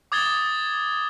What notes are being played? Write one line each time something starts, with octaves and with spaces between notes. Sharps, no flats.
D6 D#6 G#6 A6 G7